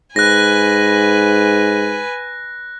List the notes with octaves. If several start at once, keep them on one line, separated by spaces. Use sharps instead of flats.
G#2 B4 G#5 F#6 A#6